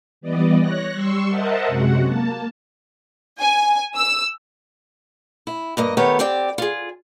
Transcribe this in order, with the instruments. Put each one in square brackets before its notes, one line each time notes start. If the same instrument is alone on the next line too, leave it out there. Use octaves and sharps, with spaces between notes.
[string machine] E3 G3 B3 D5 D#5
C#5 F#6 A#6
G3 C6 C#6 E6
A#4 C5 D#5 E5 F#5 A5
F#2 C3 G#3 F#4 F#5
A#3 A5
[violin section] G#5
E6
[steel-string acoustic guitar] E4
G2 A#3 D#5
D#3 A3 B3 G4 C#5
C4 G4 D5 G5
F4 G#4